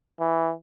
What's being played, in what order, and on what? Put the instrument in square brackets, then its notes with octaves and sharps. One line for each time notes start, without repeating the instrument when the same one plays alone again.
[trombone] E3